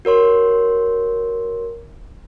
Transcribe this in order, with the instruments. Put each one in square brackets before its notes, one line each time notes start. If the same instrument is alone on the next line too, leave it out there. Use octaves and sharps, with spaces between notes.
[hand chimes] F#4 A#4 C#5 C6